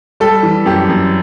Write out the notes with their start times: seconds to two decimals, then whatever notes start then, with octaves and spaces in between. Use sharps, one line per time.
0.20 G3 A4
0.43 E3
0.66 F#2 G4
0.89 F#2